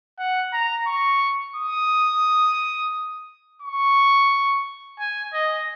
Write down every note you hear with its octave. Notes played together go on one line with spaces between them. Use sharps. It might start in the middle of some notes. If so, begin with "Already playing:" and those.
F#5
A#5
C#6
D#6
C#6
G#5
D#5